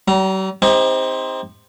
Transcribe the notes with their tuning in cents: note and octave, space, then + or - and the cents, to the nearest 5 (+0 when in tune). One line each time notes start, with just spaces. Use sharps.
G3 -45 A#5 +0
C4 +0 D#4 +30 G4 +45